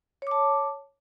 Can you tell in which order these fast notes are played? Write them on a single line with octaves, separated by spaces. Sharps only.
C#5 D6 A5